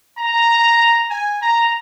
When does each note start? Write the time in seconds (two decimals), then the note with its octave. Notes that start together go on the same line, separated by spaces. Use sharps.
0.18 A#5
1.10 G#5
1.42 A#5